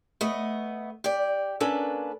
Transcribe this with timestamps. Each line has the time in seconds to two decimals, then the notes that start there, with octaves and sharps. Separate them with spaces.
0.21 A3 B3 D#5
1.04 G4 D5
1.60 A#3 C#4 D4 A4 B4